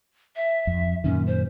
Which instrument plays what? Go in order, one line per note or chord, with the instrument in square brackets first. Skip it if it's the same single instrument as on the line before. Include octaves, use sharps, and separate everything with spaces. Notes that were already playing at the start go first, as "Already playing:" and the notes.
[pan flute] E5
[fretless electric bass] F2
[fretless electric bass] F#2 A#2 D#3 [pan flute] C#4
[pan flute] C5